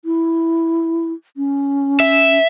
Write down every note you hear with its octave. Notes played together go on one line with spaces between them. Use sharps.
E4
C#4
E5